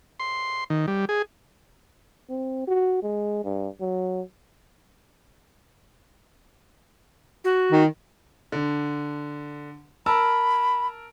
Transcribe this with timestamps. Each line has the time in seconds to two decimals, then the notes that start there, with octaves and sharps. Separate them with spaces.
0.20 C6
0.70 D#3
0.88 G3
1.09 G#4
2.29 C4
2.67 F#4
3.02 G#3
3.44 G2
3.81 F#3
7.44 F#4
7.71 D#3
8.52 D3
10.06 A#4 A5 B5 E6